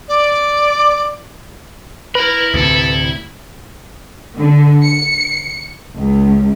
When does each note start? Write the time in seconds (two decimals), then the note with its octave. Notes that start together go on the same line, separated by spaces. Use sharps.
0.08 D5
2.15 E4 A#4 B4 B5
2.54 D2 A2 C3 A4
4.37 D3
4.83 C#7
5.96 C#2